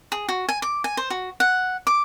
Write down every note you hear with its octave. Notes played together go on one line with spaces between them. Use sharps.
G#4
F#4
G#5
D6
G#5
C5
F#4
F#5
D6